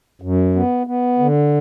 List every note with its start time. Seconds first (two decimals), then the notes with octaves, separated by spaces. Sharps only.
0.22 F#2
0.55 B3
0.87 B3
1.19 D3